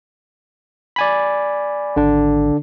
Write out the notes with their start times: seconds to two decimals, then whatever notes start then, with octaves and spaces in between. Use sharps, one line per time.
0.96 D5 G#5 B5
1.96 G#1 D3 D4